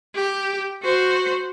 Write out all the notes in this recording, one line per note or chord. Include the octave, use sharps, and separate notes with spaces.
G4
F#4 C5